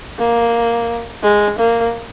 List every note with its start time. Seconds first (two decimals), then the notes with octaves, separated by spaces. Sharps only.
0.19 A#3
1.23 G#3
1.59 A#3